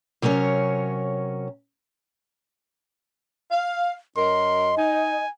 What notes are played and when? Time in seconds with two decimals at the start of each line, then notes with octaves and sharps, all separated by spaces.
0.22 C3 F#3 C#4 A#4 C#5
3.51 F5
4.17 F#2 A#4 D#5 C6
4.78 D#4 G#5